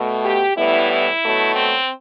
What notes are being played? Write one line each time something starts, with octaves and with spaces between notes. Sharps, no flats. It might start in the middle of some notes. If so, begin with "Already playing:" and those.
Already playing: B2 A3
G4
A2 E3 G3 B3 E4
E4
B2 F#3 A3
C4